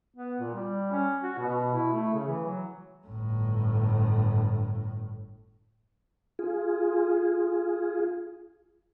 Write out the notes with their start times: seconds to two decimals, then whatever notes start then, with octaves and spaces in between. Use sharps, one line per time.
0.16 B3
0.40 A#2
0.54 G3
0.92 C#4
1.23 F#4
1.38 B2
1.74 E4
1.93 A3
2.13 C#3
2.27 E3
2.45 F#3
3.07 G1 A2
6.39 F4 G#4